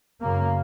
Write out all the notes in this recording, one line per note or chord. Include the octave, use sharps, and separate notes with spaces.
F#2 C#3 A#3